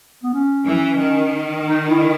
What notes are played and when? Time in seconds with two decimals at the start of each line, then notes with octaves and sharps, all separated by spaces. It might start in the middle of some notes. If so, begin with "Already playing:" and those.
0.23 B3
0.33 C#4
0.66 E3
1.00 D#3
1.67 D#4
1.89 E4